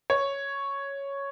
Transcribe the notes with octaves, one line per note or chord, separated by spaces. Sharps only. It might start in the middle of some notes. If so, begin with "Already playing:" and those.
C#5